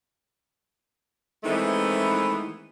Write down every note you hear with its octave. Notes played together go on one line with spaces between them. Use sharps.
D#3 E3 G#3 A3 B3 C4